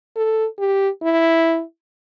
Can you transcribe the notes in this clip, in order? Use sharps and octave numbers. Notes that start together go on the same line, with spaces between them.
A4
G4
E4